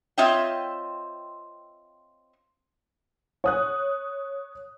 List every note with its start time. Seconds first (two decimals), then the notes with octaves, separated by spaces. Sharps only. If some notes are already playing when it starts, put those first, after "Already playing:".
0.18 C4 F4 C#5 D#5 E5 G5
3.44 C#5 D#6 F#6